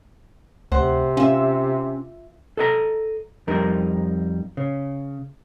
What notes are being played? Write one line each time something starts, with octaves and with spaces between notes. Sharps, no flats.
D2 C3 C5 F#5
C#4 F4 E5
A4 D#5 A#5
F2 G3 D#4 A#4
C#3